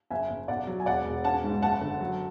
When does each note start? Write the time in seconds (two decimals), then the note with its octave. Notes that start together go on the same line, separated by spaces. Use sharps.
0.11 F#1 E5 G#5
0.30 F#1
0.48 B1 D5 F#5
0.67 F#3
0.80 G#5
0.86 E1 D5 F#5
1.05 E1
1.24 C#4 F#5 A5
1.44 G#2
1.62 F#1 F#5 A5
1.81 D3
2.00 F#3